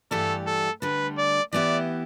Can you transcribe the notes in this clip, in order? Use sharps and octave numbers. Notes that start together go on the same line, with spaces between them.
G2 E3 A3 G4 A4 D5
A4
D2 D3 G3 B4
D5
E3 B3 E4 G4 D5